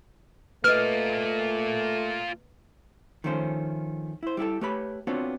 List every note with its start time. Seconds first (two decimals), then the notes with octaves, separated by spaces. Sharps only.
0.64 A3 A#3 F4 B4 D#5 F6
3.24 D#3 F3 A3 C#4 G4 C5
4.23 E4 C5
4.37 G3 E4 G4 A4
4.61 A3 G4 B4 C#5 B5
5.07 B3 C4 D4 F4 F#4 C#5